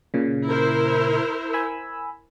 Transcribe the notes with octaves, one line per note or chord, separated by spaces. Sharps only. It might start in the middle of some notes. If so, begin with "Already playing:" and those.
A#2 C#3
E4 A#4 C5
G#5 B5 E6